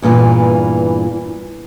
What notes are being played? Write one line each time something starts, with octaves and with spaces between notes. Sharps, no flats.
E2 G2 A#2 E3